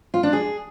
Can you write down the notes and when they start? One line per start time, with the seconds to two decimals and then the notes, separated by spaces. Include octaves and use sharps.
0.14 F4
0.23 D4
0.33 G#4